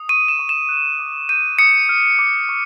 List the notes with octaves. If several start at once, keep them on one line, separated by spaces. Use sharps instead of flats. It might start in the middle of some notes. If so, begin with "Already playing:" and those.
Already playing: D#6
C#6 D#7
E7
C#6
E7
F#6
D6
G6 D#7
D#6 C#7
F6
D6
C#6